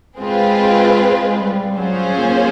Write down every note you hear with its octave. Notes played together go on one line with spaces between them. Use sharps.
G#3 C4 F4 G#4 B4
G#3
G3
F#3 C#4 F4 G#4 C5
A#3